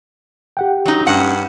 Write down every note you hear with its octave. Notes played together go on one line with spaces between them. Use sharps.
G4 F#5 G5
F#3 D#4
G2 C#4 F#5